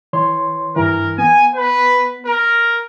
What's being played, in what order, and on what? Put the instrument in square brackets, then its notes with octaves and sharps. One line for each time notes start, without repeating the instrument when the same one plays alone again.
[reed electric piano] E3 C#5 C6
[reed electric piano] G2 E3 [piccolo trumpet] A#4
[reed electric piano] B3 [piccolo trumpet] G#5
[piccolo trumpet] B4
A#4